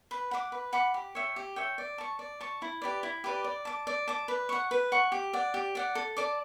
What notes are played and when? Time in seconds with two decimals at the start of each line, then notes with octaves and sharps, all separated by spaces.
0.11 B4
0.31 F#5 B5 D6
0.52 B4
0.73 F#5 B5 D6
0.94 G4
1.15 C#5 E5 G5
1.36 G4
1.56 C#5 E5 G5
1.78 D5
1.98 A5 C#6
2.19 D5
2.41 A5 C#6
2.62 E4
2.82 G4 B4 D5
3.03 E4
3.24 G4 B4 D5
3.44 D5
3.65 A5 D6
3.87 D5
4.08 A5 D6
4.28 B4
4.49 F#5 C#6
4.71 B4
4.92 F#5 C#6
5.12 G4
5.33 D5 F#5
5.54 G4
5.75 D5 F#5
5.95 A4
6.17 D5 A5 D6